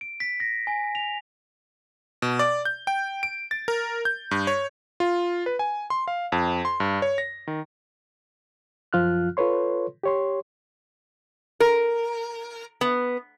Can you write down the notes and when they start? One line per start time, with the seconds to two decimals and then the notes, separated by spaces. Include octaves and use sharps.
0.01 D7
0.20 B6
0.40 A#6
0.67 G#5
0.95 F7
2.22 B2
2.39 D5
2.65 G6
2.87 G5
3.23 D7
3.51 A6
3.68 A#4
4.05 G6
4.31 G2
4.47 C#5
5.00 F4
5.46 B4
5.59 G#5
5.90 C6
6.08 F5
6.32 F2
6.65 C6
6.80 G2
7.02 C#5
7.18 A#6
7.47 D#3
8.93 F#2 F3 F4 F6 F#6
9.37 F4 A4 B4 C#5 C6
10.03 G4 C#5 C6
11.60 A#4
12.81 B3